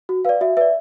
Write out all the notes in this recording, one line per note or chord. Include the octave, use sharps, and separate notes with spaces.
F#4
B4 D5 F5
F#4 E5
B4 D5 E5